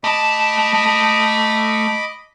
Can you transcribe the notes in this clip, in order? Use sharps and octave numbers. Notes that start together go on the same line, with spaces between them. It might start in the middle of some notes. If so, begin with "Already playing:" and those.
A3 D#5 A5 B5 D6